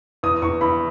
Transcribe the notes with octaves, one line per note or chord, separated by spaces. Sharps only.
E2 D#6
E2 C#6
E2 B5